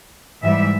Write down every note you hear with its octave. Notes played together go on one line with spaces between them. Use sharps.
G#2 E3 G3 E5